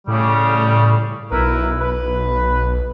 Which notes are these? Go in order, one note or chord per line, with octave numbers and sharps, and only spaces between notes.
A2 C#3 G3
B1 E4 A#4 B4
B4